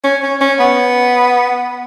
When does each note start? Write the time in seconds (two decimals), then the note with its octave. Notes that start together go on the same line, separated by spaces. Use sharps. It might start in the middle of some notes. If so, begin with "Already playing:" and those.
0.04 C#4
0.22 C#4
0.41 C#4
0.60 B3